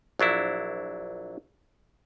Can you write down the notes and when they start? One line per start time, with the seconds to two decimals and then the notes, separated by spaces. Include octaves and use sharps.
0.19 A#1 F#3 D4 E4